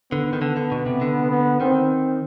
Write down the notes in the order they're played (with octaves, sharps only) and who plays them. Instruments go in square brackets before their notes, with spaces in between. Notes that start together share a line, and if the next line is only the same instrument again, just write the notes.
[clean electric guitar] D3 [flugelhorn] B3
[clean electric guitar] D#3
[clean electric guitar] D3 [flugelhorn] B3
[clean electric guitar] D3
B2
C3
D3
[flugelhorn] B3
[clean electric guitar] D#3 [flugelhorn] C4